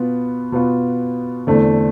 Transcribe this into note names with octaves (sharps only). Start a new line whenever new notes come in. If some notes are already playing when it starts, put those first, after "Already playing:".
Already playing: B2 B3 F4
B2 B3 F4
E2 D3 A3 C4